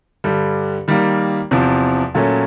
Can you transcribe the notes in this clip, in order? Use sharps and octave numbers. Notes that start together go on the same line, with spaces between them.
G2 D3 G3
D#3 G3 A#3
E2 C3 F3
A#2 F#3 A3 C#4